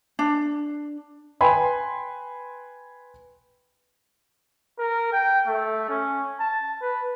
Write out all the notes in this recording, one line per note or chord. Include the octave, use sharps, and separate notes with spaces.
D4
B4 G5 G#5 B5 C6
A#4
G5
A3
C#4
A5
B4